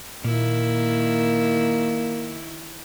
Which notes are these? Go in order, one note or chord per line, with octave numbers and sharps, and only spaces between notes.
A#2 D#3 A#3 E4